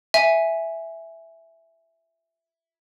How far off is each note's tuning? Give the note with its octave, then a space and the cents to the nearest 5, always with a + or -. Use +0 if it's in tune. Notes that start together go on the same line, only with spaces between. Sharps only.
E5 +0 G#5 +0